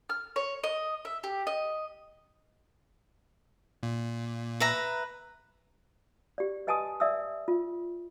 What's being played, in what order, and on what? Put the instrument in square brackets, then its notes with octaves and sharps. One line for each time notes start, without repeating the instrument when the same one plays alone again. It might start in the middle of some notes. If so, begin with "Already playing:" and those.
[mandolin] F6
C#5
D#5
E5
G4
D#5
[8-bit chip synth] A#2
[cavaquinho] B4 E5 A#5
[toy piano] G4 D5
B4 D#5 G#5 A5 C6 D#6
D5 E5 D#6 E6
F4